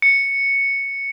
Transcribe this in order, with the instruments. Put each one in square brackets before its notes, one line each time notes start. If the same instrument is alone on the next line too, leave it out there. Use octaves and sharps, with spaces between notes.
[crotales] C#7